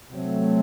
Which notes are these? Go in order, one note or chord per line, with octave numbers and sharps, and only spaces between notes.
C3 F#3 A3 C4